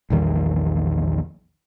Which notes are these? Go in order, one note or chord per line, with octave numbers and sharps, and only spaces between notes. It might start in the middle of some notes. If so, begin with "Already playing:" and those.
A#1 E2 D#3 G3